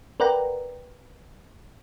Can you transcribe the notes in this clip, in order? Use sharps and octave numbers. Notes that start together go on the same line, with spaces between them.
A#4 B4 D5 F#5 G5 A#5